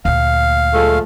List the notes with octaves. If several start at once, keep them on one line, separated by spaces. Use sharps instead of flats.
D2 A#2 F5
F3 G#3 A3